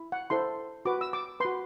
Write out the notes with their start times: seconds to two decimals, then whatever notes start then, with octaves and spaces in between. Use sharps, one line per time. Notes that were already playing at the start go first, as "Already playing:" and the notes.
Already playing: E4
0.12 F#5
0.30 E4 A4 C5 C6
0.85 F#4 B4 D6
1.01 E6
1.13 D6
1.40 F#4 B4 C6